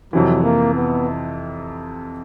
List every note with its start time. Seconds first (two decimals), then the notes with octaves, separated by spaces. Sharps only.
0.13 F2 C3 E3 F#3
0.44 A#3
0.75 B3